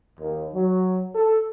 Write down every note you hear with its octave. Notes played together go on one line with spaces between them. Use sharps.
D#2
F#3
A4